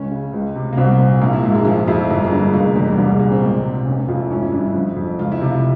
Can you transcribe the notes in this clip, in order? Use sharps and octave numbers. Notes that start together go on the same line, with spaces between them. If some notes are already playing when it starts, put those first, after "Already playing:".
Already playing: C#2 C#4
C#3
C#2
C3
A#3
C2 C4
A#2
A#1 A#3
E4
G#2 A#3
G#3
F3 G#3
F2 E4
G1 A#3
G#3
G2
G#3
F1 A#3
E2 G#3
G3
C2 G3
G#3
A#2 A#3
C4
C#2
C3
F1 C#4
F2 F4
E4
G#1 C#4
E4
G2
F3 F4
F2
C#2 F4
E4
C3 F4